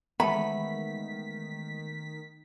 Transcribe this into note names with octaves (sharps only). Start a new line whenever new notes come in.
D#3 E3 G#3 A3 B3 A4 B5 B6